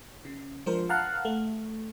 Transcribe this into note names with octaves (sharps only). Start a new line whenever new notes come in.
C#3
F3 G#3 D4 A#4 C5
F5 F#5 A5 A#5 F6 F#6
A3